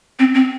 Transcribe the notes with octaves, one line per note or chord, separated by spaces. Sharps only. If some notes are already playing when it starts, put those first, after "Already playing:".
C4
C4